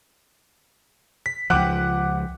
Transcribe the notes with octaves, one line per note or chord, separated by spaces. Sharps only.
B6
C#2 F3 F#5 G5 D6 F#6